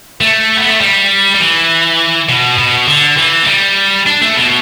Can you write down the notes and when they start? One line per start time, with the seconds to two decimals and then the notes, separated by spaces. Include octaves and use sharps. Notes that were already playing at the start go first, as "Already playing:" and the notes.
0.21 A3
0.57 B3
0.69 A3
0.81 G3
1.35 G3
1.40 E3
2.29 B2
2.58 B2
2.87 D3
3.17 E3
3.43 A3
3.47 G3
4.07 D4
4.22 A3
4.36 B2